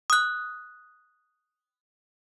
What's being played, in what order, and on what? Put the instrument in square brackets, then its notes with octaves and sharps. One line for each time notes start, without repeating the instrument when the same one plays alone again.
[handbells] D#6 F#6